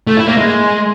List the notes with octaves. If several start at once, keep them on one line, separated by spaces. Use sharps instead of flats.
A3
E4
A#3
G#3